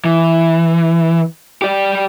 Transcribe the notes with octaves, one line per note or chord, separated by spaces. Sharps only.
E3
G4 D5